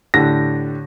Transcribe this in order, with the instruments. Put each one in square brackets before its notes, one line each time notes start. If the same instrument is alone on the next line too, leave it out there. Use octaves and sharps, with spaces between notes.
[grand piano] A2 D3 G4 A#6